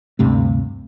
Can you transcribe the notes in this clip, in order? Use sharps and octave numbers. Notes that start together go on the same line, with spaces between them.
D2 G2 C3 A3